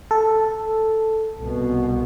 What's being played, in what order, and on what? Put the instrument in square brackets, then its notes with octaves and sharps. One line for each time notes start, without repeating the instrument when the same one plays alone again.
[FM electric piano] A4
[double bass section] C2 B2